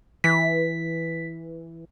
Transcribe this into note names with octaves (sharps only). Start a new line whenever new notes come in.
E3 B6